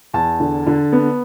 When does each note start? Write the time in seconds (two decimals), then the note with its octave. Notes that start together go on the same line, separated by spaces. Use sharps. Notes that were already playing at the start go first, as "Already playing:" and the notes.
0.14 E2 A5
0.40 D3
0.67 D3
0.92 B3